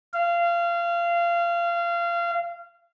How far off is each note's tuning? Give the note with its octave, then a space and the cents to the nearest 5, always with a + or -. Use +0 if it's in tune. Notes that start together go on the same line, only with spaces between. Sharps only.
F5 -25